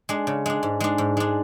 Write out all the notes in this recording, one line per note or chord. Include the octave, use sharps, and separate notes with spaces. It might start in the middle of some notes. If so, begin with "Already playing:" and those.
G#3 D4
C#3
G#3 D4
G#2
G#3 D4
G#2
G#3 D4